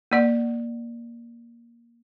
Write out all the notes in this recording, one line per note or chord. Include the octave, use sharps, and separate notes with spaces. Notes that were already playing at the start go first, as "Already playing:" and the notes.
A#3 D5 F#5